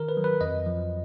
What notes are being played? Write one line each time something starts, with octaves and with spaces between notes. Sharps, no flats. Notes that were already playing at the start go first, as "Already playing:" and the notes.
Already playing: D#3 A#4
B4
F#3
B4
F2 D#5
F3